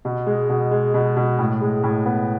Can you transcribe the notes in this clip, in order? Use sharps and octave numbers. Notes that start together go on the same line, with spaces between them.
B2
G#3
B2
G#3
B2
B2
A2
G#3
A2
B3